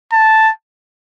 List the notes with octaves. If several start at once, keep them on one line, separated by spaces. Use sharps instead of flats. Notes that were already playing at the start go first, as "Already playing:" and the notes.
A5